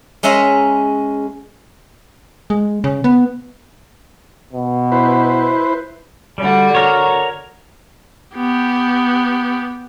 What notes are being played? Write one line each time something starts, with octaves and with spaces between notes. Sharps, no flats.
G#3 C#4 E5 A#5 C6
G#3
C#3
B3
B2
E4 B4 C5
D3 G3 F#4
A#4 C#5
B3 G4